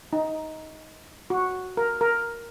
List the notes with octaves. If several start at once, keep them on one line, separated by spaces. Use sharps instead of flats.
D#4
F#4
A#4
A#4